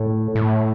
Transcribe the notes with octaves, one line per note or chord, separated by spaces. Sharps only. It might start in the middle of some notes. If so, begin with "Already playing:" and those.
Already playing: A2
A2